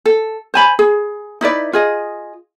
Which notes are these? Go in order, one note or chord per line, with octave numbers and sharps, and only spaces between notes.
A4
C5 G#5 B5
G#4
D#4 E4 B4 D5
F4 G#4 D#5